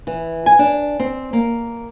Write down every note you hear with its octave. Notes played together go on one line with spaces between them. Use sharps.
E3
G#5
D4
C4
A#3